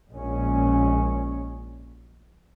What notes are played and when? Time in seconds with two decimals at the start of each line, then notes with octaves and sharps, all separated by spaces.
0.11 A#1 A#2 G#3 C#4